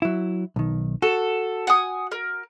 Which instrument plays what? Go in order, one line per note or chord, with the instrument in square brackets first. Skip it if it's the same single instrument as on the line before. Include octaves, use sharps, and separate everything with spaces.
[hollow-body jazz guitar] F#3 E4
B1 D#3
[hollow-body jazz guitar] F#4 [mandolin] A4
[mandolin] F#5 G#5 D#6
A#4